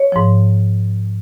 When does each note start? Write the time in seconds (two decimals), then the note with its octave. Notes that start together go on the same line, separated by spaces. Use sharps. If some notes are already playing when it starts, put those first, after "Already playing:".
Already playing: C#5
0.12 G#2 F3